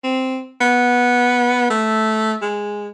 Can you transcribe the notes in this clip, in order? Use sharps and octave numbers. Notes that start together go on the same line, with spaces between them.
C4
B3
A3
G#3